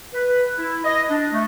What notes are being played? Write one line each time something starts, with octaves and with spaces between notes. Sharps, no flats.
B4
E4
D#5
D4
A3